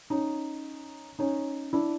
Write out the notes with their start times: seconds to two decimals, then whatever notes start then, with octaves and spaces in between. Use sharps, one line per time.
0.10 C#4 D#4
1.19 C#4 D#4
1.73 D4 E4